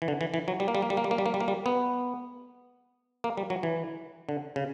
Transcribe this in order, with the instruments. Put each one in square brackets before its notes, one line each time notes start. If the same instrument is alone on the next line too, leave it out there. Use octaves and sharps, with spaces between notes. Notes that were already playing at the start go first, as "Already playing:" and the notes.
[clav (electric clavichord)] E3
D3
E3
E3
F#3
G3
A#3
G3
A#3
G3
A#3
G3
A#3
G3
A#3
G3
A#3
G3
B3
A#3
G3
F#3
E3
D3
C#3